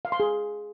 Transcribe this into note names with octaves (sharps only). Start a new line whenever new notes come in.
F5
C6
G#4